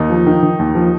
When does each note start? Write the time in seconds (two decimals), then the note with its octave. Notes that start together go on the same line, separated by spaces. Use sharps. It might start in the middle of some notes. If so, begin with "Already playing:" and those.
Already playing: D#2 D#4
0.10 F3
0.27 D#3
0.43 D#3
0.59 D#2
0.75 F3